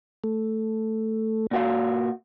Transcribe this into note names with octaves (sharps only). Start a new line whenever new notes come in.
A3
A#2 F#4 F5